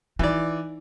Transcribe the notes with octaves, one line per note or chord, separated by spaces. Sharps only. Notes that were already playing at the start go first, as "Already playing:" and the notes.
E3 D#4 D5